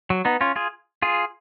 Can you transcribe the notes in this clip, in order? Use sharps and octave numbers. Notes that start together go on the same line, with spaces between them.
F#3
B3 D#4
C#4 F4
F4 G#4
F4 G#4